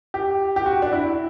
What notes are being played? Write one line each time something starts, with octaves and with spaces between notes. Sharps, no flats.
G4
G4
F#4
D4
E4